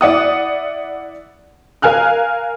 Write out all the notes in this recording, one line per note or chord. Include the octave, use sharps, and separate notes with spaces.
E4 D5 F#5 D#6
A#4 F5 G#5 F6 F#6